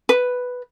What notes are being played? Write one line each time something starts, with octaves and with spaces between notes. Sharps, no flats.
B4